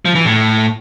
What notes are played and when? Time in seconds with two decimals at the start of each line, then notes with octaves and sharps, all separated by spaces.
0.05 F3
0.15 E3
0.25 A2